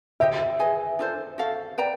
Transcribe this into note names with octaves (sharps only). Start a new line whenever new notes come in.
G4 C5 D#5 E5 G5
G#4 B4 D#5 G#5
D4 F4 A4 C5
F#4 A4 C5 F5
B4 D5 G5 A#5